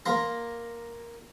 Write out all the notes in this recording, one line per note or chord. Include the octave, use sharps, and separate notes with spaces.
A#3 A#5 C6